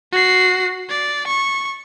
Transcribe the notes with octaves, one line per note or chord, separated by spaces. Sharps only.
F#4 C7
D5
C#6